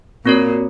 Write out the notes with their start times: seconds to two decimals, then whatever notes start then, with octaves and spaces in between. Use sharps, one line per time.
0.25 A#2 C4 F#4 A#4 C#5